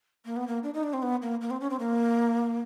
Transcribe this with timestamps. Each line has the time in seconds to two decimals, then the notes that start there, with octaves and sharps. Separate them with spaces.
0.25 A#3
0.36 B3
0.47 A#3
0.63 D4
0.74 D#4
0.83 D4
0.93 C4
1.02 B3
1.22 A#3
1.41 A#3
1.50 C4
1.61 C#4
1.70 C4
1.79 A#3